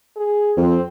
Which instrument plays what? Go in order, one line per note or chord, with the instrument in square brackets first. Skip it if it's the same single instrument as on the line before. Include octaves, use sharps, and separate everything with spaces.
[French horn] G#4
[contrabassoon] F2 [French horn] C4